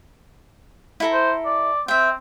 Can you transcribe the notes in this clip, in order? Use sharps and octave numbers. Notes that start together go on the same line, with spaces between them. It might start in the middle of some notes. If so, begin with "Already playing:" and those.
E4 A4 A#5
C5
D5
C4 E5 G5